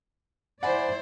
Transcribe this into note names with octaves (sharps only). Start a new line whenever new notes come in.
E4 C5 D5 F#5 G#5 B5